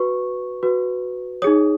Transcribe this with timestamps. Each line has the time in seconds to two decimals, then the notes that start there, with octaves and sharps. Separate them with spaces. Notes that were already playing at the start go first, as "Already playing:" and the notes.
Already playing: F#4 B4 C#6
0.63 F#4 B4
1.42 D#4 G#4 C#5 D#6